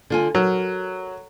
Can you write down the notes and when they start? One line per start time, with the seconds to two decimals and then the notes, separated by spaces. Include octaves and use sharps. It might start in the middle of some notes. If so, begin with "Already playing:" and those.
0.10 D3 F4 G#5
0.35 F#3 A#4